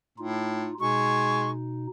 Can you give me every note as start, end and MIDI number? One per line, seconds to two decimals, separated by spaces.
0.18 0.67 45
0.18 0.74 63
0.18 0.74 65
0.80 1.87 47
0.80 1.51 56
0.80 1.87 63
0.80 1.51 85